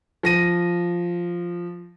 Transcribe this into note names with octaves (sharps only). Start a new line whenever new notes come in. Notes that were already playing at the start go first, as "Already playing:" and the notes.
F3 A#6 D#7